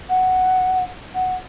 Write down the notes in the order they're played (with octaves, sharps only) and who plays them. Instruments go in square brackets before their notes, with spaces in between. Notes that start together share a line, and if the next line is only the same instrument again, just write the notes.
[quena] F#5
F#5